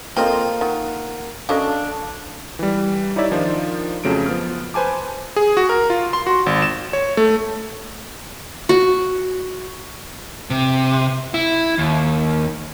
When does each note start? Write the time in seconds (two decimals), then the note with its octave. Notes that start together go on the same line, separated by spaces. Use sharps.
0.17 F3 A#3 C4 F4 A4 D#5 F5 G5
0.61 D#3 F#5
1.49 F#3 C#4 D4 A4 D#5 F5
2.59 E3 G3
3.16 D#4 E4 G4 C#5 D5 E5
3.31 D#3 F3 D4 D#4 F4 D5
4.04 F2 C#3 F#3 A3 D7
4.26 F3 B3 F6
4.74 B4 C5 G#5 A5 D6
5.36 G#4
5.57 F#4
5.69 A#4
5.90 F4
6.13 C6
6.27 F#4
6.46 G#1
6.62 E7
6.93 C#5
7.17 A3
8.69 F#4
10.50 C3
11.34 E4
11.78 D#2